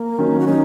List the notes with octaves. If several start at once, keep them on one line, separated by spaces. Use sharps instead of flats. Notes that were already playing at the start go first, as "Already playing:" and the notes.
Already playing: A#3
D#3 F#3 C#4
F#4
F#3 C#4 D#4